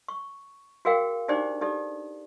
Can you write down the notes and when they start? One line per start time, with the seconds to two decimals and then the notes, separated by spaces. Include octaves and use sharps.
0.08 C#6
0.85 F#4 G#4 A#4 F5 G5
1.28 D4 D#4 G4 G#4 C5 D5
1.61 D#4 G4 A4 D5